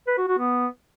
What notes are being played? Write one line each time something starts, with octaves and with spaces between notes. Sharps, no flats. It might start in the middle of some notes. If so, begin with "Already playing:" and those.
B4
F#4
F#4
B3